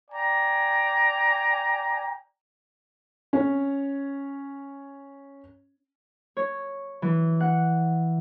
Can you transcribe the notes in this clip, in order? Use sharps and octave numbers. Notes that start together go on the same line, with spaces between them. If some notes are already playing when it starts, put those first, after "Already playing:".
D5 G5 G#5 A#5
C#4 C#5
C#5
E3
F#5